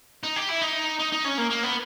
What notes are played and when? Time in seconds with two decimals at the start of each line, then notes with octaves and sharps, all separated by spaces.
0.23 D#4
0.36 G4
0.49 E4
0.62 D#4
0.99 D#4
1.12 D#4
1.24 C#4
1.38 A#3
1.50 A#3
1.63 B3